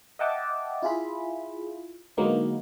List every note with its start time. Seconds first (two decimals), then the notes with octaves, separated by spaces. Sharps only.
0.19 D#5 E5 F#5 G5 A5 D6
0.82 E4 F4 G#4 B5
2.17 D3 F#3 G#3 A#3 B3 D#4